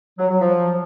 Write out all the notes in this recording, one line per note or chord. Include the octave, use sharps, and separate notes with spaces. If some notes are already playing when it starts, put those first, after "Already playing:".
F#3
F#3
F3